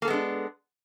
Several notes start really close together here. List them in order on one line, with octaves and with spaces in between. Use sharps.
A#3 A4 B3 G#3 D4